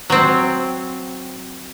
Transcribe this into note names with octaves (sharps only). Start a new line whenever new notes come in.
F#3 C4